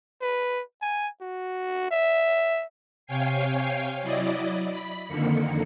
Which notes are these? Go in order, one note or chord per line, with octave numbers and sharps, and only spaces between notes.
B4
G#5
F#4
E5
C3 C#5 F5 G5 G#5 C7
F#3 E4 D5 D#5
B5
F2 D3 D#3 A#3 C#7